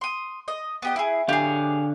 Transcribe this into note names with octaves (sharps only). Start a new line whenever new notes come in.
C6 D#6
D#5
B3 G4 D#5
E4 G#4
D3 G4 G#4 F5